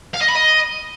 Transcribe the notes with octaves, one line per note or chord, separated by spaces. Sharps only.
F5
D#5
B5
D#5